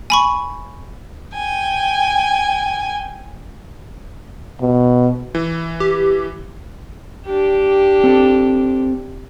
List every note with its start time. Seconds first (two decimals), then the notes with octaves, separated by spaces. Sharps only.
0.10 G#5 B5 C#6
1.34 G5 G#5
4.61 B2
5.35 E3
5.80 G4
7.26 D4 G4
8.04 C4 A4